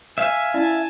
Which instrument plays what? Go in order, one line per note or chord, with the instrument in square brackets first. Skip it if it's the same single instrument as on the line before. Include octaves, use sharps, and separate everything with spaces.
[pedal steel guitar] E5 F5 [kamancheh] G#5
[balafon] C#4 E4 D5 [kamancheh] G#5 A5